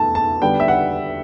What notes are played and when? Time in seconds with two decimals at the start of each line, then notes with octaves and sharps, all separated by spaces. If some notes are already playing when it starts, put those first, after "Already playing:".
Already playing: E2 B2 A3 A5
0.15 A5
0.41 D3 G3 B3 D4 G5
0.60 E5
0.68 F#5